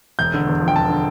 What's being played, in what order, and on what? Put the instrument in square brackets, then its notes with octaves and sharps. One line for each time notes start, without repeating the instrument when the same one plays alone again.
[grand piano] E1 G6
D3
E2
F3
G5
E1 A5
D3